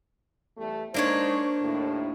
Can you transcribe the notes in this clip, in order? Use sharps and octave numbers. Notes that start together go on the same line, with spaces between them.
E2 G3 A3
G#3 A#3 D4 D#4 C5 C#5
D#2 A2